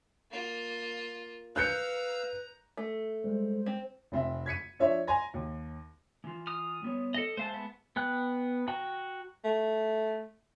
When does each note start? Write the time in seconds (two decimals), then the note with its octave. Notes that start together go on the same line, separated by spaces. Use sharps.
0.30 A#3 F4
1.56 B4 F5 A#5 E6 F#6 G6 C#7
2.77 A3
3.24 G3 G#3 C5
3.66 C4
4.12 F1 C4 E5
4.46 G#6 B6 C#7 D#7
4.79 F3 D4 C#5 E5
5.07 G#5 A#5 C6 A#6
5.34 D#2
6.24 E3 F4
6.47 D#6 F6
6.82 G3 B3 C#5
7.14 A4 D#5
7.37 G#3 C5 E5 F5 A5
7.54 B3
7.96 B3 G5 F#6
8.68 F#4 G5 A#5
9.44 A3